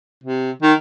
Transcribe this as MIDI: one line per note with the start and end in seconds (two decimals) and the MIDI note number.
0.24 0.51 48
0.62 0.73 51